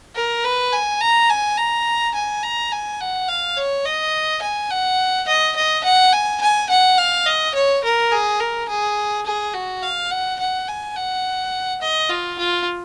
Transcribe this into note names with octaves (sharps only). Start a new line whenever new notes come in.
A#4
B4
G#5
A#5
G#5
A#5
G#5
A#5
G#5
F#5
F5
C#5
D#5
G#5
F#5
D#5
D#5
F#5
G#5
G#5
F#5
F5
D#5
C#5
A#4
G#4
A#4
G#4
G#4
F#4
F5
F#5
F#5
G#5
F#5
D#5
F4
F4